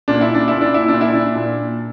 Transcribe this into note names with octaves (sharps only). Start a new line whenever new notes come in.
A#2 D4
E4
D4
A#2 E4
D4
E4
D4
A#2
E4
D4
A#2